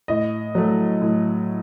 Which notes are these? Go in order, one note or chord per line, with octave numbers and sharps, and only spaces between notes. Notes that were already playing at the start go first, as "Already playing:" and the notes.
A2 D#5
F#3 A3
A2